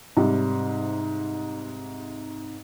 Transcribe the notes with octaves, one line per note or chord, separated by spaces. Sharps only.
G#2 C3 G3